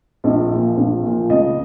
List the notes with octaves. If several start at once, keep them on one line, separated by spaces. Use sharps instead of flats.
A#1 D#5
A#2 F3
A#1
A#2 F3
C#2 D#5